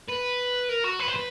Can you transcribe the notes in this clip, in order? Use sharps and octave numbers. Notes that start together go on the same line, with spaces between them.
B4
A#4
F#4
B4
C5
B4